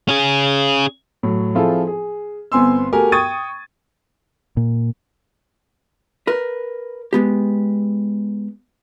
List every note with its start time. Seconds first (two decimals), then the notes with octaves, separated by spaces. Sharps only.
0.08 C#4 G#4
1.23 A2 F#3
1.55 F3 C4 E4 F4 G#4 A4
1.87 G#4
2.52 G1 B3 C4 G#5 C6 E6
2.92 A3 F#4 G4 A#4 G#5
3.12 G5 C#6 D#6 G#6 A6 D#7
4.57 A#2
6.27 A#4 B4
7.13 G#3 B3 G4